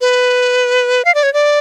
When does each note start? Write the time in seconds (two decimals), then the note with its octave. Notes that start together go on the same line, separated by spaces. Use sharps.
0.01 B4
1.05 F5
1.15 D5
1.23 C#5
1.33 D5